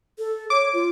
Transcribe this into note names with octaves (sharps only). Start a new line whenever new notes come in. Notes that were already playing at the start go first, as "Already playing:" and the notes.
A4
C#5 D6
F4